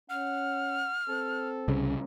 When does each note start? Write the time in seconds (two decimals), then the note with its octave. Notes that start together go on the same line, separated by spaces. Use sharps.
0.10 C#4 F#5 F6
1.09 C4 A4
1.68 C2 C#3